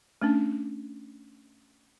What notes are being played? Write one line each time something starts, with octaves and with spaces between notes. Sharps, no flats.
A3 C#4 D4